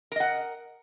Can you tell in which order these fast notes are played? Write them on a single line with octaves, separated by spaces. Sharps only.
A#4 D#5 F#5